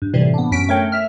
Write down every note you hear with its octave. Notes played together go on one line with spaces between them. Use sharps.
G2
A2 C3 E3 G3
B3 D4
F#2 C#4 B6 D7
A3 A#4 C#5 G5
E5 F6